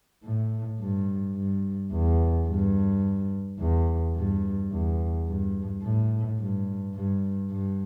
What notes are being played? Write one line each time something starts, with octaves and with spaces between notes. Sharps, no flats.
A2
G2
G2
E2
G2
E2
G2
E2
G2
A2
G2
G2
G2